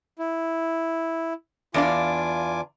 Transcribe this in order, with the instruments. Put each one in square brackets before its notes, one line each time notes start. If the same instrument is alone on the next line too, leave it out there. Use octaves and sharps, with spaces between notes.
[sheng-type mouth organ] E4
[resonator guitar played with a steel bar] E2 D4 F5 [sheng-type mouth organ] F4 G#5 D6